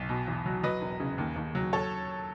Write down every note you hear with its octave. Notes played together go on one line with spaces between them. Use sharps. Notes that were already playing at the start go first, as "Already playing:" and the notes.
Already playing: B1
B2
E2
F#3
F#3 B4 D#5
E1
C#3
D#2
D#2
F#3
A4 C#5